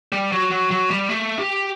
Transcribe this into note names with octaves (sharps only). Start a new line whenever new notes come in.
G3
F#3
F#3
F#3
G3
A3
G4